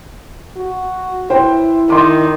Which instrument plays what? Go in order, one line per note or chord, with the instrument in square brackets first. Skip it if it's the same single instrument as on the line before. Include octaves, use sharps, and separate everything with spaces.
[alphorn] F#4
[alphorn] E4 [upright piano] B4 C5 G5
[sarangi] D#3 [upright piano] C6 D6